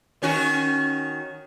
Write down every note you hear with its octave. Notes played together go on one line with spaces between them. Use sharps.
D#3 C#4 F#4